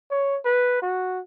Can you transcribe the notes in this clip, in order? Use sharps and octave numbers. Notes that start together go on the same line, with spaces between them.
C#5
B4
F#4